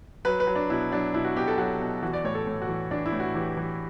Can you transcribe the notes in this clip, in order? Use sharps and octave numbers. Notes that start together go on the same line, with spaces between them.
F#3 B4
B4
F#3
D4
B2 E4
F#3 D4
B2 E4
F#4
B2 G4
A4
F#3 F#4
B2
E3 F#4
D5
A2 C#5
A4
A2
F#4
E3
E3 D4
E4
A2
F#4
E3 G4
E3